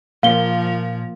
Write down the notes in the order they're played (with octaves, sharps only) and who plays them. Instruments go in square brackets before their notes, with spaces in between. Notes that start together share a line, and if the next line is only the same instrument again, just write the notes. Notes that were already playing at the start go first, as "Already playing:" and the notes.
[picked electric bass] A#2 [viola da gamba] F3 [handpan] A#3 [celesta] F5 G7